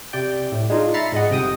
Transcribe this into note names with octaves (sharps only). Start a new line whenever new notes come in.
C3 D5 G5
A2
G#3 D4 D#4 F4
E5 A#5 B5 A6 C7 C#7
G#2 G#3 D#5 F#5
G1 C3 G5 D#6